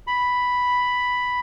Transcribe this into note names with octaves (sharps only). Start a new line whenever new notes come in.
B5